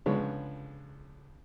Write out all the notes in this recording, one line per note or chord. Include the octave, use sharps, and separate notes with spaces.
C#2 D3 F3 G#3 B3 C#5